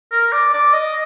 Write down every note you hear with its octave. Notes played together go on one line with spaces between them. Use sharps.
A#4
D5
D5
D#5